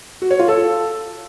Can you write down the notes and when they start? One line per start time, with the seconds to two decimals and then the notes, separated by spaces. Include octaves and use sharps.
0.22 F#4
0.31 C#5
0.39 F4
0.48 A4